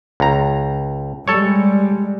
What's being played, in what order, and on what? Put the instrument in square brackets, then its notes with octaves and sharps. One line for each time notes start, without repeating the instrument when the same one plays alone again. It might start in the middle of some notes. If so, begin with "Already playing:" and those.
[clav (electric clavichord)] C#2 A#5
[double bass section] G3 G#3 [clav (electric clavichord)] A4 C#5